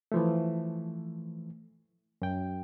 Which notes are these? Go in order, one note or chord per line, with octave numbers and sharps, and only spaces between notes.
E3 F3 A3
F#2 G5